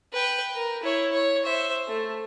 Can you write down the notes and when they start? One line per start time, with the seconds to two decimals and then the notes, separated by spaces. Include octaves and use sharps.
0.13 B4 G5
0.55 A#4
0.83 E4 C#5
1.12 C#5
1.44 C5 E5
1.88 A3